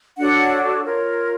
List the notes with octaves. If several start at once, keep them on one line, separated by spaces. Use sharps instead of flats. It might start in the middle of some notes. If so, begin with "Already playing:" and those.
D4 F#4 A4 C#5 F#5
F4 A#4 C#5